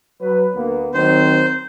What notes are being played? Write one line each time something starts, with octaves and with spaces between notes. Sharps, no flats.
F#3 B4
D2 A#3 B3
D#3 F#3 C4 C5